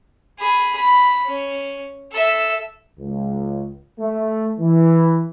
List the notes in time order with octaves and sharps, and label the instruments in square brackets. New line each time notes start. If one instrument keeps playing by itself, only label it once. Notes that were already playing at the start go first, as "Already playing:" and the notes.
[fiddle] G#4 B5
B5
C#4
A4 E5
[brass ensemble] C#2
A3
E3